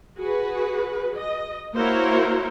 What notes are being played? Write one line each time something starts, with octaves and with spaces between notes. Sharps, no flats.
F#4 G#4 B4
D#5
A#3 E4 F#4 A#4 C5 C#5